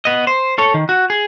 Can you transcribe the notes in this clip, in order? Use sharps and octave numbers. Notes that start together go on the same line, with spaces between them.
B3 D#5
C5
A4 C#5
D#3
F#4
G#4